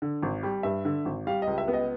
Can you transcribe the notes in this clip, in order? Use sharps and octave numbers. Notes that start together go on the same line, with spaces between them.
D3
G#1
G3
G2 E5
D3
G#1
G3 F5
D#5
C#2
E5
B3
D#5